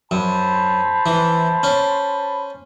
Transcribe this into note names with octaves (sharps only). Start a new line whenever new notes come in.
F#2 C5 A5 B5
E3
C#4